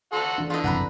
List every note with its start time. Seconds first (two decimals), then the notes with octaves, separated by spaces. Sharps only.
0.13 F#4 A4 F5 A#5 C6
0.38 E3 D4
0.50 D3 F4 D#5
0.64 F#1 C2 F2 F#5 A#5 B5